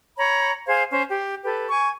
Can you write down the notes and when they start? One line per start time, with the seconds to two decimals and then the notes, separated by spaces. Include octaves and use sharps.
0.17 C#5 A#5 B5
0.67 G#4 C5 F5 G#6
0.91 C#4 C5
1.10 G4
1.44 G4 A4 B4
1.69 G#5 C#6